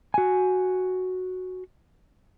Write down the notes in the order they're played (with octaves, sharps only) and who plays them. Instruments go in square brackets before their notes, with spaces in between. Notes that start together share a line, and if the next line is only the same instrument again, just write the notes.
[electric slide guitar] F#4 G#5